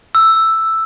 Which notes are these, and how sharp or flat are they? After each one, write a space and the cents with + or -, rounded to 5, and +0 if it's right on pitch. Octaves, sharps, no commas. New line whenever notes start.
E6 +5